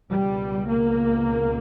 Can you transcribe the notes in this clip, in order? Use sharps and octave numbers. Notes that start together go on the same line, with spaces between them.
C#2 B2 G3
A#3